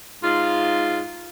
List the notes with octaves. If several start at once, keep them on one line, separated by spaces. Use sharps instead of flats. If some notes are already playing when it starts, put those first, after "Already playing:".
G#2 F4